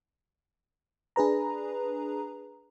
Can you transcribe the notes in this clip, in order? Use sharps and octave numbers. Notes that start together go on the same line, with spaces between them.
D4 G#4 B4 A#5